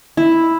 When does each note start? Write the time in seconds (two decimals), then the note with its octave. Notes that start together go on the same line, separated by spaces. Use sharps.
0.17 E4